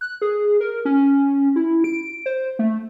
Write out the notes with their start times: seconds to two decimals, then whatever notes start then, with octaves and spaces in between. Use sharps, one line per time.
0.01 F#6
0.22 G#4
0.60 A#4
0.85 C#4
1.56 E4
1.84 D7
2.26 C5
2.59 A3